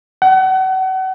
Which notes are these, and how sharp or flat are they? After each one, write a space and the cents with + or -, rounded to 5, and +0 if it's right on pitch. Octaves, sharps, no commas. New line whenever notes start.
F#5 +35